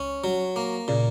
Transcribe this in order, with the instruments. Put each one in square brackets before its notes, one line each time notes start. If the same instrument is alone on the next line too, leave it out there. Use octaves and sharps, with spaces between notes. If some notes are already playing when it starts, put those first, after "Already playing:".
Already playing: [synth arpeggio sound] C#2 [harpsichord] C#4
[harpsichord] F#3
A#3
[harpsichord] A#2 [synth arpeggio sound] C#3